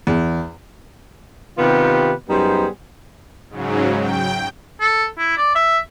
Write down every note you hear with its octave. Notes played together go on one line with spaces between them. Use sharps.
E2
C3 D#3 B3 F4 G4 B4
F#2 G3 B3 D#4 G#4 C5
G#2 C#3 F#3
G5
A4
E4
D5
E5